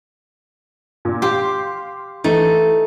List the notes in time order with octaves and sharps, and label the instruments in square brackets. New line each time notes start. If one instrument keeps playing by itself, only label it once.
[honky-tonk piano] A#2
[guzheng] G4 [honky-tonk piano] F5 C6 D6
[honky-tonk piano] E3 [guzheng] A3 D#4